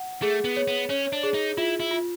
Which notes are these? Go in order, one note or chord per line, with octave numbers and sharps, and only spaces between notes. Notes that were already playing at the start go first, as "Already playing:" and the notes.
Already playing: F#5
A3 G#4
B3
C#5
B3
C#4 C#5
D4
G#4
D#4
E4 F4
E4
F4